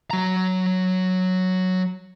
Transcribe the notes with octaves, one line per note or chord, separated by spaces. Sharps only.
F#3 A#5